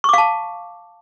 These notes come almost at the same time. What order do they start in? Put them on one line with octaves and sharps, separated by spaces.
C#6 D6 F5 A5